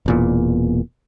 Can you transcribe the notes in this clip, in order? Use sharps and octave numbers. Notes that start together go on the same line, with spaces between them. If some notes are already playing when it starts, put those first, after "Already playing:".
E1 E2 A#2